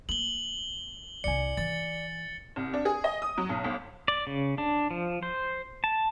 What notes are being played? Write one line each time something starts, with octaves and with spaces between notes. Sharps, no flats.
A#3 F#7 G7
C2 E4 D5 G#5 C#7
E3 A6
C2
D4
G#4
D#5
D#6
F#3
B1
G1
D5
C#3
D4
F3
C5
A5